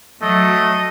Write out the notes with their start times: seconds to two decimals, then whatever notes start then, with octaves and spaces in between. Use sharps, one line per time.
0.22 F#3 A3 D#5